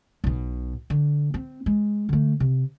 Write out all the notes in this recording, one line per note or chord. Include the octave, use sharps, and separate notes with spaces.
B1 B2
D3
C4
G#3
D3 A3
C3